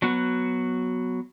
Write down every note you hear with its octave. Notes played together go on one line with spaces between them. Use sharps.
F#3 B3 F#4